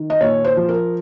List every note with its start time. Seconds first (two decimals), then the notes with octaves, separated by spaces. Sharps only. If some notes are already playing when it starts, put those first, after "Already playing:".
Already playing: D#3
0.10 D#5
0.21 A#2 C#5
0.44 C5
0.57 F3
0.69 A#4